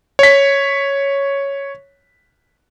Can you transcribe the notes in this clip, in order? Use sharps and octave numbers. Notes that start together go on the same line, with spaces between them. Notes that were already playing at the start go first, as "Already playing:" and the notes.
C#5 B6